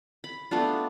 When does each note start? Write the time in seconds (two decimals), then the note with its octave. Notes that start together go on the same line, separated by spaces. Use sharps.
0.24 B5
0.51 A3 B3 D4 F4